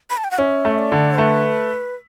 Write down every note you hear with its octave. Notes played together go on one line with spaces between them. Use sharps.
B5
A5
G5
F#5
C#4 E5
A3
D5
D3
A3 B4